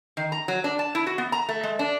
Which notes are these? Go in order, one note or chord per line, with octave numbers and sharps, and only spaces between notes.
D#3
A#5
F#3
D4
A5
E4
F#4
B3
A#5
A3
G#3
D4